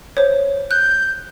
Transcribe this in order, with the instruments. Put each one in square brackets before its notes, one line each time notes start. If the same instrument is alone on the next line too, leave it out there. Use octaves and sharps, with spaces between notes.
[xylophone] C5 C#5
[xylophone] F#6 [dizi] G6